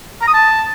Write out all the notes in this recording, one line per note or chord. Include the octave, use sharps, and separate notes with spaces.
A#5
D#6
A5